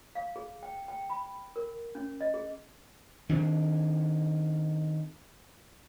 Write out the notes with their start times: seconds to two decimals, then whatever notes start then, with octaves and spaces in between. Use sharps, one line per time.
0.15 F5
0.36 G#4
0.63 G5
0.88 G5
1.10 B5
1.56 A#4
1.95 C#4
2.21 D#5
2.34 G#4
3.29 D#3 C4 D4